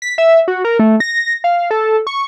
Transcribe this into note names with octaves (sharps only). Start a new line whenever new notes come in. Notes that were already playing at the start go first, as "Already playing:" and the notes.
B6
E5
F#4
A#4
A3
A#6
F5
A4
C#6